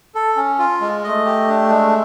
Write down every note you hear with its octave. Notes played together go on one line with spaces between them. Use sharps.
A4
C#4
F4
G#3
A3 D#5
G4
D4
G#3